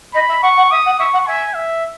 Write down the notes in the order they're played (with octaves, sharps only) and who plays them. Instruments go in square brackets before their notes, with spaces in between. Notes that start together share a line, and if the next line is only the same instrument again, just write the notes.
[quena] D#5 [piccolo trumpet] B5
[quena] E5
[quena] F#5 [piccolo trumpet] C#6
[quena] F#5
[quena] E5 [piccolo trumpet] D#6
[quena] F#5
[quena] E5 [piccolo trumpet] C#6
[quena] F#5
[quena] E5 [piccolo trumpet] G#5
[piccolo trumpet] E5